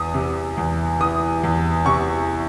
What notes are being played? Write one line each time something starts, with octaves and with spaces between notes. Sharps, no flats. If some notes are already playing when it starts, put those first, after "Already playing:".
Already playing: E2 E3 D#6
C3
E2
E3 D#6
E2
C3 C#6